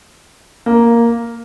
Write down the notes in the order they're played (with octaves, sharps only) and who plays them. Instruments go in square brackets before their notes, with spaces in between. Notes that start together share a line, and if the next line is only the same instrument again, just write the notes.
[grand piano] A#3